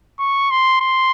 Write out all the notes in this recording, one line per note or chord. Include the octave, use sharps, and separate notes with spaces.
C#6
C6
C6